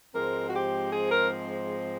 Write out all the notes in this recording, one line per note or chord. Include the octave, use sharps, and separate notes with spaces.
G#2 F3 G#3 C4 A#4
F#4
G4
G#4
A#4